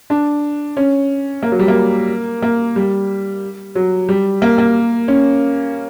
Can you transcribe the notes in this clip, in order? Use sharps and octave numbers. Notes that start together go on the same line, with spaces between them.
D4
C#4
A#3
F#3
G3
A#3
A#3
G3
F#3
G3
A#3
A#3
C#4